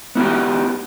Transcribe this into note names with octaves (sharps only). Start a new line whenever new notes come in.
B3 E4 F#4 G4